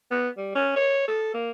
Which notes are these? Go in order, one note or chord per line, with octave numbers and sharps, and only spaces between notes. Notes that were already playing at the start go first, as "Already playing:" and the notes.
B3
G3
C#4
C#5
A4
A#3